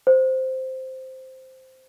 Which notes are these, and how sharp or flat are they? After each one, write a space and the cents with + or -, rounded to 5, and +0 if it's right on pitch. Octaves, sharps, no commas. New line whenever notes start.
C5 -5